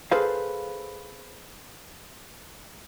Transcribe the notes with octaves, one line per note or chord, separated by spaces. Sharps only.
G#4 A4 B4 C5 F5